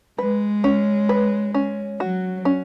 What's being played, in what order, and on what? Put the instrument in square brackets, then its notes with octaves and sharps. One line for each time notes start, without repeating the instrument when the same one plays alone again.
[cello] G#3 [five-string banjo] B4
[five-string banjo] C#4
B4
C#4
[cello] F#3 [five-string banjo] F#4
[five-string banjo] C#4